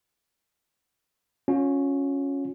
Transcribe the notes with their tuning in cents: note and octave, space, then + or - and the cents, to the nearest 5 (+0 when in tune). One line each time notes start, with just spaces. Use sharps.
C#4 +0 F4 +40